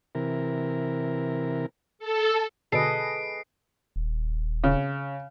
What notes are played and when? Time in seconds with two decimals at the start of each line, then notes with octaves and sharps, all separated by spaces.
0.15 C3 E3 A#4
1.99 A4
2.72 B2 D3 G#4 A4 B4 D#5 C7 D7
3.96 D#1
4.64 C#3